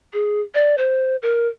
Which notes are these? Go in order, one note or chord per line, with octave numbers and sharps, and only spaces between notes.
G#4
D5
C5
A#4